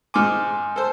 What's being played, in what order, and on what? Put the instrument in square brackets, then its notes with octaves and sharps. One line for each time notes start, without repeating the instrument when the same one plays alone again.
[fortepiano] G#2 D6 [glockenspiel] G#5 C6 F6
[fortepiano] A4 C5